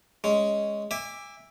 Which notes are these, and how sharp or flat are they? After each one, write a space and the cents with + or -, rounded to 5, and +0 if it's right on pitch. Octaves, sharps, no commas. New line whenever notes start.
G#3 +0 C#4 +0
E5 +0 G#5 -35 D6 +0